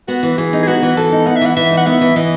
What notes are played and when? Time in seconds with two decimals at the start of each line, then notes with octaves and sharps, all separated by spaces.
0.08 B3 F#4
0.23 E3
0.38 E3 G#4
0.53 D#4
0.63 G#4
0.67 B3 F#4
0.83 E3
0.97 E3 A4
1.12 D#4
1.26 B3 F#5
1.36 E5
1.41 E3 F#5
1.57 E3 E5
1.71 D#4
1.77 F#5
1.86 B3 E5
2.01 E3
2.16 E3 D#5